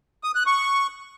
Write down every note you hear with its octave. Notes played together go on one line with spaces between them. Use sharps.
D#6
F#6
C#6